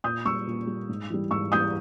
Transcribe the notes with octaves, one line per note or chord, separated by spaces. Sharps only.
A#2 D#6 G6
G3 C#6 E6
A#2
G3
G#2
E3 G3
G#2 C#6 E6
E3 G3 D#6 G6